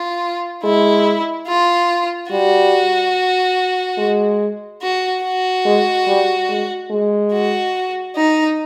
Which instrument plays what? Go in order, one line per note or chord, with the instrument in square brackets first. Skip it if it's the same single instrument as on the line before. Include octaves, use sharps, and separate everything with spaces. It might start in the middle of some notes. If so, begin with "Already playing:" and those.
Already playing: [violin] F4
[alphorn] G#3 [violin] E4
[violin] F4
[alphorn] G3 [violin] F#4
[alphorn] G#3
[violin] F#4
F#4
[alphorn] G#3
G3
G#3
G#3
[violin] F#4
D#4